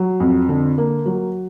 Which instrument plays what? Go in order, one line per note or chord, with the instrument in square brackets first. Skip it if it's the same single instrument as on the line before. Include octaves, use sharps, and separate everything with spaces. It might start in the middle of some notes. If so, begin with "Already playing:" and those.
Already playing: [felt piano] F#3
F2
D3
A#3
F#3